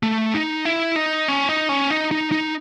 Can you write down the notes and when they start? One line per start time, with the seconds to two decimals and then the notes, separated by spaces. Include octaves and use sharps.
0.03 A3
0.34 D#4
0.65 E4
0.96 D#4
1.28 C#4
1.49 D#4
1.69 C#4
1.90 D#4
2.11 D#4
2.32 D#4